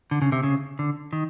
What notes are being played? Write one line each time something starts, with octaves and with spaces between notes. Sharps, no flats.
D3
C#3
C3
C#3
D3
D#3